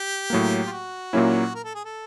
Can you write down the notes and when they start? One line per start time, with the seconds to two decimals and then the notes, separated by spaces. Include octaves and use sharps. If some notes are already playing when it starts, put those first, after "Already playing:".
Already playing: G4
0.30 A2 F#3 A#3
0.66 F4
0.72 F#4
1.13 A#2 F#3 A#3 C#4 E4
1.55 A#4
1.64 A4
1.74 G#4
1.84 A4